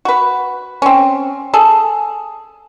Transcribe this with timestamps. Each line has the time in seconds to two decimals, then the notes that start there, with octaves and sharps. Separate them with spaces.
0.05 F#4 B4
0.82 C4 C#4
1.54 G#4 A4